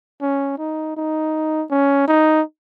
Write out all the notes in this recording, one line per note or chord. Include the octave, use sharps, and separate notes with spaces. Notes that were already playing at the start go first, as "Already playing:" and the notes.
C#4
D#4
D#4
C#4
D#4